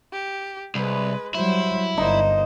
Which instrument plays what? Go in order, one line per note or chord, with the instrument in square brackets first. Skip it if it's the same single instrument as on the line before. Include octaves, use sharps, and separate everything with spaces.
[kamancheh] G4
[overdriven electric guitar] C2 [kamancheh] G#3 B4
[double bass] F#3 G3 [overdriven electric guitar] E4 [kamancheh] C5
[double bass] G1 [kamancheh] A#3 C5 [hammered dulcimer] D#4